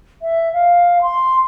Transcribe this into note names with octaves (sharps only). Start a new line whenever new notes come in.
E5
F5
C6